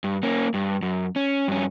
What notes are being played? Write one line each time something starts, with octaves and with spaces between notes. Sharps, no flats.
G2
A#3 C#4
G2
F#2
C#4
G2 C#4